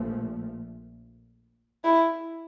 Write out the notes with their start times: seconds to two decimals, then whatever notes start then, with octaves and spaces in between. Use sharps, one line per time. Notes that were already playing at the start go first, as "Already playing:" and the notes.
Already playing: A#1 A#2 F3 A3
1.84 E4